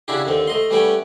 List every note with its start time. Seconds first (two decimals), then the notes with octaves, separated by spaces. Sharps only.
0.08 C#3 D4 E4 F#4 G4
0.25 D#2 D3 C4
0.47 A3 D#5 C6
0.70 G3 A3 C#4 B4 F#5 G5